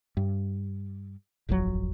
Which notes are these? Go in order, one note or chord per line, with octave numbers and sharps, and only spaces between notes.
G2
D1 G1 F2 F#3